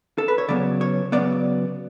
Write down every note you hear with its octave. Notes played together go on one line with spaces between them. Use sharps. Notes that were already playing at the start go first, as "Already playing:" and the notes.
A4
B4
C#5
C#3 F#3 B3 D5
C#5
C#3 F#3 B3 D5